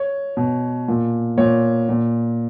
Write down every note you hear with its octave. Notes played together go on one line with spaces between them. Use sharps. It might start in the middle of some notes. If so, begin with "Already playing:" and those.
Already playing: C#5
B2
A#2
A#2 C#5
A#2